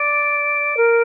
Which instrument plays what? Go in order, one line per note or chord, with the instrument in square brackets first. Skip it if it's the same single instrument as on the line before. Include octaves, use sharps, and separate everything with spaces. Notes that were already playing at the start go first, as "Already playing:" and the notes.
Already playing: [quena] D5 [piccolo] D7
[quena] A#4